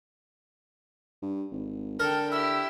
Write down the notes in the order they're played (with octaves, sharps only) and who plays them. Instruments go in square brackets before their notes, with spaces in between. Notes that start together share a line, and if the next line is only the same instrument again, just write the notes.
[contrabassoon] G2
G#1
[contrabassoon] D3 [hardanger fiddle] A4 G5 [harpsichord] A#4
[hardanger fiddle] E4 G4 [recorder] E6